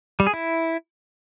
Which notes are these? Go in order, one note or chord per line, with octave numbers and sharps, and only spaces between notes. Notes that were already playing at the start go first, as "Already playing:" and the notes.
G3
G#4
E4